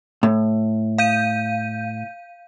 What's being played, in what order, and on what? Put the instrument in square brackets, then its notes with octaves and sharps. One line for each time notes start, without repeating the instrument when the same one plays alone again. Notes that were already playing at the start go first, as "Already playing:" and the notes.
[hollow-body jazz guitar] A2
[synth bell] F5 G6 D#7